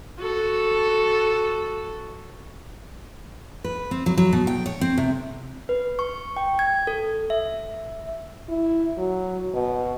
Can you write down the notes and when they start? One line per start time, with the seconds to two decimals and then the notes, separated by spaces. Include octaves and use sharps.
0.20 F#4 A4
3.64 B4
3.91 C4
4.06 F#3
4.18 F#3
4.33 B2
4.47 G5
4.66 C#5
4.81 C4
4.98 C3
5.69 B4
5.99 C#6
6.37 G5
6.59 G#6
6.87 A4
7.30 E5
8.49 E4
8.97 F#3
9.54 B2